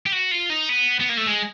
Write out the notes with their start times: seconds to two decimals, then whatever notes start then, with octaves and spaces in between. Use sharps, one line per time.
0.06 G4
0.12 F#4
0.31 F4
0.50 D#4
0.69 B3
1.00 B3
1.09 A#3
1.17 A3
1.26 G#3